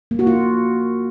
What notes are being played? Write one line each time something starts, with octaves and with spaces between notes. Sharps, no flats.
A#3
F#4
F4